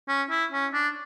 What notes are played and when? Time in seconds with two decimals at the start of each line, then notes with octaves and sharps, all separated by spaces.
0.08 C#4
0.30 E4
0.52 C#4
0.74 D4